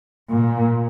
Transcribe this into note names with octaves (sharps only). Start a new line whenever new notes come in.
A#2